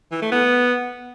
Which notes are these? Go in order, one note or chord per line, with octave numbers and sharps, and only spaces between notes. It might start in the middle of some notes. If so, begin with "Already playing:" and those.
E3
A3
B3